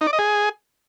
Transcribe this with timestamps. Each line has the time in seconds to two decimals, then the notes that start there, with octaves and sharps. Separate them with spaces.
0.01 D#4
0.07 D5
0.13 D#5
0.19 G#4